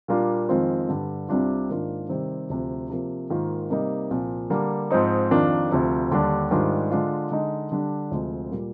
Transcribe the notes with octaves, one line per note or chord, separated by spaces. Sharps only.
A#2 G3 A#3 D4 F4
F2 D#3 G#3 C4 F4
G2 D3 G3
C2 C3 G3 D4 F4
G#2 D#3 A#3 D4 F4
C3 D#3 G3 C4
D2 C3 F3
C3 F3 A#3
G#2 D#3 A#3 F4
C3 G3 A#3 D#4
C2 A#2 F3
D3 G3 A#3
G#2 F3 C4 D#4
F2 D#3 A#3 D4 F4
D2 C3 F3
D#2 D3 G3 D4
G#2 D#3 G3 D4 F4
D3 G#3 D4 F4
D3 G#3 D#4
D3 G3 D4
D2 C3 F3 G#3
A#2 G3 A#3